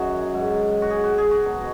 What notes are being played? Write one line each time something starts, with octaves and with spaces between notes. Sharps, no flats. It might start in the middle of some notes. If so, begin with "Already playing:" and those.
Already playing: F#2 D#3 F#3 F#4 G#4
G#2 F#3
F#4
G#4
F#4
G#4
F#4
B2 F#3